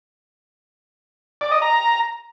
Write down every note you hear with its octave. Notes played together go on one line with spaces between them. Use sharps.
D5
D#5
A#5